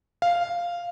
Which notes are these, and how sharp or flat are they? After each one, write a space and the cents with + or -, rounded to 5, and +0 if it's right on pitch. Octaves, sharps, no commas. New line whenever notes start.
F5 -5